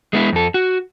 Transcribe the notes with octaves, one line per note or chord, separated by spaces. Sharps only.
G#3 B3 E4
F2 A4
F#4